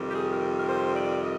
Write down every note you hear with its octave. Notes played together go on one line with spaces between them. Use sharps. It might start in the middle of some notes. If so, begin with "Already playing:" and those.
Already playing: F2 C3 D#3 G3
G4
G#4
A#4
A#4
C5
D5
D#5